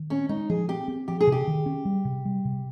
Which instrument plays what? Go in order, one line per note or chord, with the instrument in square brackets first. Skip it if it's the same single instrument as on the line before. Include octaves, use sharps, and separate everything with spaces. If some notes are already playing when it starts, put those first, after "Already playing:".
Already playing: [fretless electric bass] D#3
[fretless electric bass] C4 [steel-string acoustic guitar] C#4
[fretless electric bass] G#3 [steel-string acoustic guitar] D#4
[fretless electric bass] F3 [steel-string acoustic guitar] G#4
[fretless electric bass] C4 [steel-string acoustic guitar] G4
[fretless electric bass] C4
[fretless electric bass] F3 [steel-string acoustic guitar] G4
[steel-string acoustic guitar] G#4
[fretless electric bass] C3
[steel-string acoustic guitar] G4
[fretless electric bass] D#3
C#4
G3
C3
G3
C3